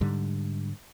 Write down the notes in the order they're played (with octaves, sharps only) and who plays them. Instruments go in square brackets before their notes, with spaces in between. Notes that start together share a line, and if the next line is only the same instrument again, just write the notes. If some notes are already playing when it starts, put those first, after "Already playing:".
[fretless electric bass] G#2 D3 G3